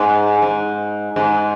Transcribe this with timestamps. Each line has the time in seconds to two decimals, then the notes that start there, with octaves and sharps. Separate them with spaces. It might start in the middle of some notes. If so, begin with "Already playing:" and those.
Already playing: G#2
0.42 G#2
1.16 G#2